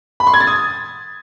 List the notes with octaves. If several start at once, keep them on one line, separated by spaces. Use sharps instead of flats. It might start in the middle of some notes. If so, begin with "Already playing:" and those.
B5
C6
G#6
A6
D#6